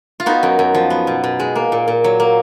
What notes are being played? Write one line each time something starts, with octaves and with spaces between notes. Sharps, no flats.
F4
B3 D#4 F#4
F#2
F#2
F3
B3
B2
B2
G#3
A#3
A#2
A#2
F#3
A#3